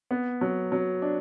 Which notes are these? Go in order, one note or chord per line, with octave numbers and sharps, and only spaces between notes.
B3
F#3
F#3
D4